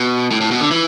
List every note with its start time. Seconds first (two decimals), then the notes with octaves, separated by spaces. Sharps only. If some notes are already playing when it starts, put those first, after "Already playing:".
Already playing: B2
0.31 A2
0.41 A2
0.51 B2
0.61 D3
0.71 E3